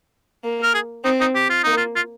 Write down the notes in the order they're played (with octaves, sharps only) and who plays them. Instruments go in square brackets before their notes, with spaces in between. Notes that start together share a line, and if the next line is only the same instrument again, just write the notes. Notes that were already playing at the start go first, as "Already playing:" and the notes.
[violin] A#3
[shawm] A#4
G#4
[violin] C4 [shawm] D#4
[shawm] D#4
G4
F4
[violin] A#3 [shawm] D#4
[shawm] F4
F4